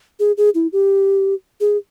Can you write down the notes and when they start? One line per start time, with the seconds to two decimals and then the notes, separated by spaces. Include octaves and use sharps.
0.20 G#4
0.37 G#4
0.55 E4
0.73 G4
1.61 G#4